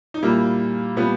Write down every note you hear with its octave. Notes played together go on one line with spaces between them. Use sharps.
D#4
A#2 G3 A#3 E4
A#2 G3 B3